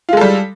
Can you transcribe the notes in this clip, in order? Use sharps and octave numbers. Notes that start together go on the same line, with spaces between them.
G3 G#3 F4 A4